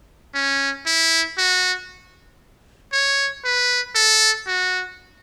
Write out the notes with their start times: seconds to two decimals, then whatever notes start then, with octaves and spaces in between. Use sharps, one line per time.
0.34 C#4
0.86 E4
1.38 F#4
2.93 C#5
3.45 B4
3.95 A4
4.47 F#4